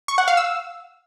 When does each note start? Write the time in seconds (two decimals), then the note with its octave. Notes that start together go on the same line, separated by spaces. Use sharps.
0.08 C#6
0.18 F#5
0.28 F5
0.37 E6